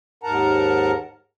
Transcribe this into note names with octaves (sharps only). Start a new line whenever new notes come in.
D#2 G#2 A#4 F#5 A5 A#5